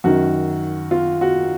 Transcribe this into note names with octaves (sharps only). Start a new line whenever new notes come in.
F#2 D#3 F#4
F4
F#4